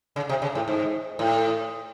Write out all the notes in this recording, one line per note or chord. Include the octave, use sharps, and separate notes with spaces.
C#3
C3
C#3
A2
G#2
A2